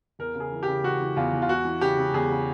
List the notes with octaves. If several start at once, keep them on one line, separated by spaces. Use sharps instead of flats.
E2 A#4
C#3
G#4
E3
C#3 G4
E3 F#4
E3
E2 F4
E2
F4
E2 F#4
E3
C#3 G4
C#3
E2 G#4
C#3